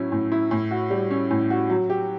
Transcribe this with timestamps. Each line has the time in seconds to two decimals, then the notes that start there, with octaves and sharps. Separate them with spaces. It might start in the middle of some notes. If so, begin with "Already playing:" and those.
Already playing: A2 F#3 C#4 E4
0.12 A2
0.32 E4
0.51 A2
0.71 F#4
0.90 G3
1.11 C#4
1.31 A2
1.50 F#4
1.70 F#3
1.90 G4